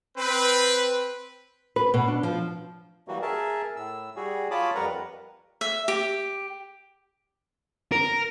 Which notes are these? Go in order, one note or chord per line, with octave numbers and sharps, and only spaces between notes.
C4 B4
B4
B2
D4
F3
E3 F#3 G3 A#3 F#4
G#4 A#4 E5 A5
A2 E6
G3 F#4 G#4
F4 C#5 A5 B5 D6 D#6
F2 G3 A#4 B4 F#5 A#5
E5
G4
A#4